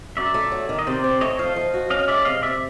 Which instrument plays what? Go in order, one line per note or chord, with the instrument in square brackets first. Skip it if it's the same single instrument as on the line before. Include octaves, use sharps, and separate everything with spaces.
[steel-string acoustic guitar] F#2 [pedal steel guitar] D5 E5
[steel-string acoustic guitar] A3
F#3
D#3
[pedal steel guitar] D#5
[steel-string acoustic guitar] C3 [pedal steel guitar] C5 D5
[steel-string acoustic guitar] C4
[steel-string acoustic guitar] A3 [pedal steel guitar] C#5 D#5
[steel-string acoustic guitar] F3 [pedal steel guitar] D#5 F5
[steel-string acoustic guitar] F3
F#4
[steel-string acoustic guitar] C#4 [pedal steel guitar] D#5 F5
[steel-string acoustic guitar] G#3 [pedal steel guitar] D5 E5
[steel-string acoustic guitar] C3 [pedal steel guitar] D#5 F5
[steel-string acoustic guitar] C3 [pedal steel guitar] D5 E5